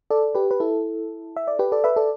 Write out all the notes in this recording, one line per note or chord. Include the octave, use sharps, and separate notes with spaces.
A4 D5
G4 B4
B4
E4 A4
E5
D5
G4 B4
A4 D5
B4 E5
A4 D5